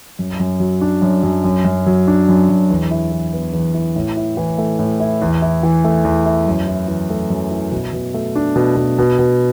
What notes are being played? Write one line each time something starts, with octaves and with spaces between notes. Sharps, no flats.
F#2
F#2
F#3
D4
F#2
F#2
F#2
F#2
F#3
D4
F#2
F#2
E2
E4
E3
B3
E2
E4
A2
E4
E3
A3
A2
E4
E2
E4
E3
A3
E2
E4
F#2
E4
E3
A3
F#2
E4
B2
B2
A3
D4
B2
B2
B2
B2